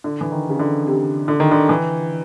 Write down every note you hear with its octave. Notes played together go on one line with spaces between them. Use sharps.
D3
E3
D#3
C#3
D3
C3
D3
D#3
D3
E3